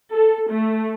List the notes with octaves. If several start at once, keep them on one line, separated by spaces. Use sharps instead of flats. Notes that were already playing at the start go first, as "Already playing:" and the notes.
A4
A3